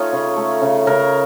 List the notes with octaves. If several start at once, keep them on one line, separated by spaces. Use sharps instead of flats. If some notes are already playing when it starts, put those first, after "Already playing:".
Already playing: A3 C#4 D#4 F4
C#3
A3
C#3
C#3 A#4